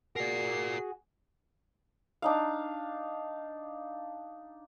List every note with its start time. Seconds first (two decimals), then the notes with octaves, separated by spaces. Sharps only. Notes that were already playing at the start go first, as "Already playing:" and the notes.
0.16 F#4 G#4 A#4 D5 C7
2.22 D4 D#4 F5